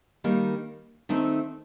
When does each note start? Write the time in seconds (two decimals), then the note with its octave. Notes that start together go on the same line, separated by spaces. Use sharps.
0.24 D#3 G3 A#3 D#4
1.09 D#3 A3 C4 D#4